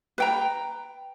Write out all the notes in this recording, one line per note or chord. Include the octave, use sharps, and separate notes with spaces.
B4 G5 A#5